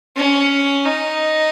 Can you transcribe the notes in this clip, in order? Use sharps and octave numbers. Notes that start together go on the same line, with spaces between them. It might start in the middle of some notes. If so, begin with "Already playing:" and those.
C#4
D#4